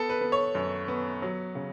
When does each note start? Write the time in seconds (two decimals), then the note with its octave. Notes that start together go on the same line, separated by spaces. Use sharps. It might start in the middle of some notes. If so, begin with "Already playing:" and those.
Already playing: B3 A4
0.09 B4
0.21 B3
0.32 C#5
0.55 F#2
0.88 B3
1.22 F#3
1.55 C#3